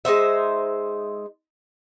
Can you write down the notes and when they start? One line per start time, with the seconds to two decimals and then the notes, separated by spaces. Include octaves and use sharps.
0.05 G#3 D#4 C5 E5